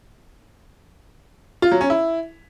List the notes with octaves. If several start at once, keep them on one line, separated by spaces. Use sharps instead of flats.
F4
F#3
C#4
E4